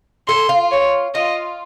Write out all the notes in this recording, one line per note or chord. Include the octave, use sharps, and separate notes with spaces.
A4 C6
F4
C#5
F4 D#5